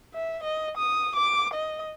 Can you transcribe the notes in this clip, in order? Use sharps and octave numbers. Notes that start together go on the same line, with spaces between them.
E5
D#5
D#6
D6
D#5